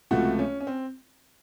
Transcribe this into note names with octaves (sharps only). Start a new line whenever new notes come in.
C#2 C3 F3 A3 F#4
C#4
C#4
C4